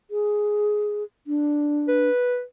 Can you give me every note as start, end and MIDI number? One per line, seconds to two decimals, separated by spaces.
0.11 1.04 68
1.27 2.09 62
1.88 2.43 71